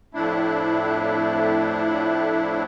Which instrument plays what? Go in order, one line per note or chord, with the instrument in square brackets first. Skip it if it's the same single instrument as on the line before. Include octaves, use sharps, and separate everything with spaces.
[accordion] F2 A2 A3 D4 E4